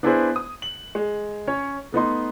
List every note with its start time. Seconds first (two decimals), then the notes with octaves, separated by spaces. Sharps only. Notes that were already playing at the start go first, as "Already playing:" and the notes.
0.03 B3 D4 E4 G#4 B4 C5
0.36 D#6
0.62 F#7
0.95 G#3
1.47 C#4 C#5
1.92 A3 B3 D#4 C6